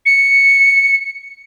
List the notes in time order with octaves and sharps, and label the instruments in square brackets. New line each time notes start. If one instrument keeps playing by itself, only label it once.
[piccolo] C#7